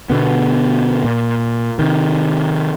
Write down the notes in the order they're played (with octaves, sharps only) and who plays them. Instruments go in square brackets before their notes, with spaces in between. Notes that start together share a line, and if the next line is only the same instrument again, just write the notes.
[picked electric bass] B2 D3 B3
A#2
C3 D#3